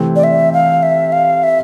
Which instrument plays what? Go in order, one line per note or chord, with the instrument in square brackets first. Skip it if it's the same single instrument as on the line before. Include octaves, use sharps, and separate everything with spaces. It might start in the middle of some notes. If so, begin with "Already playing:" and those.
Already playing: [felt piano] C3 E3 A3 C4
[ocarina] D5
E5
F5
E5
F5
E5